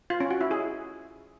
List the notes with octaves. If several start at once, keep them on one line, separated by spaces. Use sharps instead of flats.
F4
C#4
F#4
E4
G#4